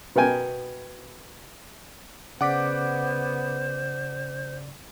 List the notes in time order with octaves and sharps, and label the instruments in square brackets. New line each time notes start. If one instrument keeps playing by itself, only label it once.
[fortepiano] B2 B3 A#4 G5 G#5
[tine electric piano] C#3 D5 B6 [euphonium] B3 [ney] C5 [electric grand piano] F#5 D6